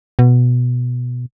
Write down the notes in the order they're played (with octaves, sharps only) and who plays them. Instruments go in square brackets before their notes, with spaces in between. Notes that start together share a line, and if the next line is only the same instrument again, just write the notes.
[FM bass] B2